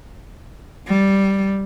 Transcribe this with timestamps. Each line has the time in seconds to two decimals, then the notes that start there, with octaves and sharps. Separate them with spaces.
0.87 G3